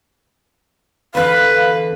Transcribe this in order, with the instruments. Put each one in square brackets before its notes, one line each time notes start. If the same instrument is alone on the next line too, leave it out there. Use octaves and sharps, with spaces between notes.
[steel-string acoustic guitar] E2 D3 [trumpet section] B4 [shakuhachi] F5